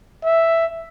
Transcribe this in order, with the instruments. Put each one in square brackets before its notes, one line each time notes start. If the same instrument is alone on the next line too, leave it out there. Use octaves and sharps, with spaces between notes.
[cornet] E5